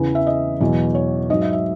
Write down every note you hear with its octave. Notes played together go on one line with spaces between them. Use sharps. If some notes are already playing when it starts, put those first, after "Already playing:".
Already playing: E2 C#3 E3 B4
E5
D#5
E2 B2 F#3
C#5
G#2 F#3 D#5
E5
E5